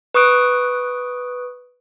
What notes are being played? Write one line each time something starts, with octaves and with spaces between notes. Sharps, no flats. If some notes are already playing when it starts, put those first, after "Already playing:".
B4 C#6 D#6 F#6 D7